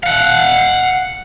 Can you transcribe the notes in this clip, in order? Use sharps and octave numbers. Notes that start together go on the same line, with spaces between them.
F5 F#5